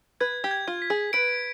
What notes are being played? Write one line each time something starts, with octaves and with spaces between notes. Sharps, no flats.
B4 G#6
G4
G#6
F4
B6
G#4
B4 D7